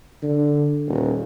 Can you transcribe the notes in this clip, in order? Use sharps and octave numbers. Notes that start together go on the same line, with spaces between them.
D3
D#1